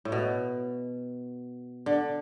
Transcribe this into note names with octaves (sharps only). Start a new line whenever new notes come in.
A2
B2
D3